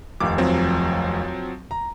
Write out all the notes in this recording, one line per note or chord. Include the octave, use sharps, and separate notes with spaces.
F1 D#2 D6
F3 F#3 C4
A#5